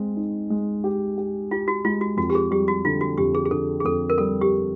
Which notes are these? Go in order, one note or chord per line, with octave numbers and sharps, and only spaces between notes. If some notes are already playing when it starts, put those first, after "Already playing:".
Already playing: G#3 C4
D#4
G#3
G4
G4
F4 G4
F#4
G#3 F4
F#4
F2 F#4
G4
G#4
G3 G4
F#4
D3 F4
F#4
F2 G4
G#4
G#4
D3 A4
G#4
F2 A4
A#4
G3 A4
G4